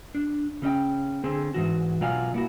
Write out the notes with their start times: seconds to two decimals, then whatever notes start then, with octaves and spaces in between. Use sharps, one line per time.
0.15 D4
0.62 C#3 C#4 D#5 G5
1.24 D3 C4 G#4
1.54 G#2 E3 F#4
2.01 B2 F#3 F4 D5 F5 G#5
2.34 A#3 E4 F#4